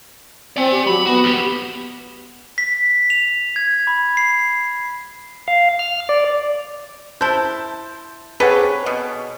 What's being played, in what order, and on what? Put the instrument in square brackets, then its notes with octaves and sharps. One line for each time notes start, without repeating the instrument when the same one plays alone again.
[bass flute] C4 [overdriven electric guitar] D5 G#5
[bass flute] G4
[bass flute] F#3 [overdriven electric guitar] B5
[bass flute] B3 [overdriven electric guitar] F#4
[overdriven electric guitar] E2 G4
[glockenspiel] B6
F7
G#6
B5
C7
[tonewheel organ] F5
F6
D5
[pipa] E4 C5 [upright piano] A5 G6
[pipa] C3 A4 B4 [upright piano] G#4 C#5 F#5
[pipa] B2